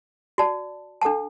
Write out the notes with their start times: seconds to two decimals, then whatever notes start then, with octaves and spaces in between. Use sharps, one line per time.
0.38 F#4 D5 A5
1.01 D4 A4 F#5 A5